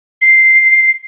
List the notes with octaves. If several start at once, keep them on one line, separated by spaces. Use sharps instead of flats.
C7